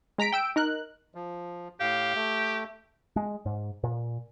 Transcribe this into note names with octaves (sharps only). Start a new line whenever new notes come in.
G#3 A#5 B6 D7
G5 E6 D7
D#4 A#4 F#6
F3
A2 G4 F5
A3
G#3
G#2
A#2